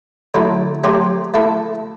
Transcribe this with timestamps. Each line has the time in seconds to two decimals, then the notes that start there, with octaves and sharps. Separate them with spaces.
0.34 D3 F#3 A3 E4
0.84 F#3 A3 C4 G4 C5
1.34 A3 E4 A4 E5